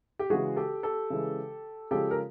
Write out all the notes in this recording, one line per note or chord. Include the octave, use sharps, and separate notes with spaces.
G4
C#3 E3 G#3 F#4 G#4
G4 A4
G4 A4
C#3 E3 G#3
C#3 F3 G#3 G4 A4
A#4